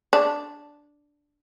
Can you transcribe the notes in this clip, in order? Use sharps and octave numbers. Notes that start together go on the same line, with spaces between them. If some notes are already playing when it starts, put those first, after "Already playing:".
D4